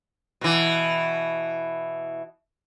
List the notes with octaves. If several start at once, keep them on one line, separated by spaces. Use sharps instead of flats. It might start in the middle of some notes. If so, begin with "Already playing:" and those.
B2 E3